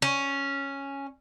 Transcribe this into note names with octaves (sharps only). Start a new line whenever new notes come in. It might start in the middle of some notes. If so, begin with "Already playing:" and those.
C#4